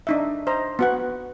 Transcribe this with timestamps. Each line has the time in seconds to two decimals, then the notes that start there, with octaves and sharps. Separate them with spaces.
0.07 D4 D#4 E5
0.47 C5 D#5 A#5
0.79 B3 F#4 F#5